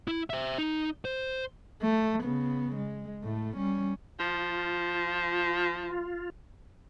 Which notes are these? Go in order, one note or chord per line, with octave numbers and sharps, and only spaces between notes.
E4
C5 E5
D#4
C5
A3
C#3 B3
G#3
A2 A3
G3 C#4
F3 F4